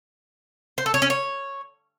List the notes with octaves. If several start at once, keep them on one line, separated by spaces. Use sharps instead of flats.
C5
A4
C#5
C#4
C#5